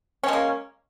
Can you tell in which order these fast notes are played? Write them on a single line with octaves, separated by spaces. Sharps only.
C#4 G#3 A#3